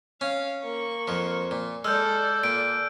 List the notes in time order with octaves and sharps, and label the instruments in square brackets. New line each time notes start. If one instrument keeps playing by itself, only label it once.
[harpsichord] C#4 [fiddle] F5
[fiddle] A#3 C#6
[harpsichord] F2 F3
A#2
[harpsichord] G#3 [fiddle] A4 D5 [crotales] E6 F6 G6
[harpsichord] A#2 [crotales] D7